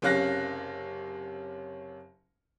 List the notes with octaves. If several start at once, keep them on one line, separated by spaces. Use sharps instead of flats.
F#1 C3 C#4 F5 F#6 A#6